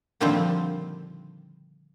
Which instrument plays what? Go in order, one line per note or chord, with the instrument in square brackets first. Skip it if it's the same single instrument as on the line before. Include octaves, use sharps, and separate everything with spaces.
[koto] A#2 D3 D#3 F3 G3 C4